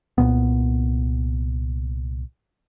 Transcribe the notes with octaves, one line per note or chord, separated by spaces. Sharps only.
C2 F2 A#2 B3